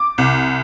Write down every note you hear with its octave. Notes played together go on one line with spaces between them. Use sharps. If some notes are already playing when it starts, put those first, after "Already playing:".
Already playing: D6
C2